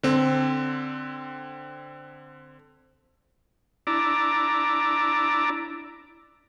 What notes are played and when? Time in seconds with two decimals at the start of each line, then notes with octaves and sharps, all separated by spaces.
0.03 D3 C4
3.87 D4 E4 D5 A#5